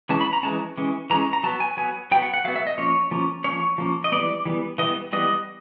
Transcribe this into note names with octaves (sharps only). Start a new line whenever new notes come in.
E3 G#3 C#4 A5
B5
A#5
E3 G#3 C#4 A5
E3 G#3 C#4
E3 G#3 C#4 A#5
A#5
F#3 B3 A5
G#5
F#3 B3 G#5
F#3 B3 G5
F#5
F#5
F#3 B3 F5
E5
D#5
F3 A#3 C#4 C#5
F3 A#3 C#4
F3 A#3 C#4 C#5
F3 A#3 C#4
D#5
E3 G3 B3 D5
E3 G3 B3
E3 G3 B3 D#5
E3 G3 B3 D#5